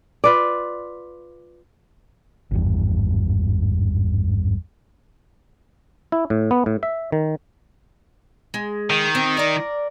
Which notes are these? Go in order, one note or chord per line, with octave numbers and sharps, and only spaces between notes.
F4 B4 D5
G#1 E2 G2
E4
A2
B3
A2
E5
D#3
G#3
D#3
C4
A#4 D5